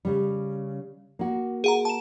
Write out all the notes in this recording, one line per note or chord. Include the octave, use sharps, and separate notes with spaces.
C#3 G3
A#3 F#4
G#4 F#5 A#5
A5 E7